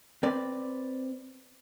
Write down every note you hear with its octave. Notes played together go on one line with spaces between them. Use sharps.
C4 B4 D5